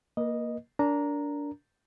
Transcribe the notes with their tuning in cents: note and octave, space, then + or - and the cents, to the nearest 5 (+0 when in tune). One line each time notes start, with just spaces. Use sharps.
A#3 +0 B4 -45 D#5 -5
D4 -20 A#4 +0 A#5 -5